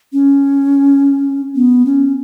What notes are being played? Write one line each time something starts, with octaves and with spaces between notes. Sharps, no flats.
C#4
B3
C#4